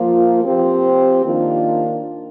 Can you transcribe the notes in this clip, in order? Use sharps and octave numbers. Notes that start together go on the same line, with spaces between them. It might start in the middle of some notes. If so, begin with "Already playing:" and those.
Already playing: F3 A#3 F4
F3 C4 G4
D#3 A#3 D4 F4